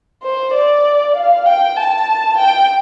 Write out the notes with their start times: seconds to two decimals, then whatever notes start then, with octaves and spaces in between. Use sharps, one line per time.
0.23 C5
0.53 D5
1.16 F5
1.46 G5
1.76 A5
2.38 G5